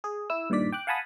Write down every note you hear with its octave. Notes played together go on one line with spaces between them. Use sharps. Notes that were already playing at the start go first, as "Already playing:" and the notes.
G#4
E4 E6
G2 A#2 D#3 D5 B6
G5 D6 F#6
F5 F#5 G#5 A5 B5 D#6